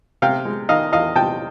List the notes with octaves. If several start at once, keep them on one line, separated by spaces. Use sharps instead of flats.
C3 F5 G5
G#3
D#3 D#5 F5
E2 D#5 F5
C3 G5 A5